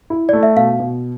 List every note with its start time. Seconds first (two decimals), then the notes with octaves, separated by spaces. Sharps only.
0.10 E4
0.29 A3 D5
0.43 E5
0.56 B2 F5
0.80 B2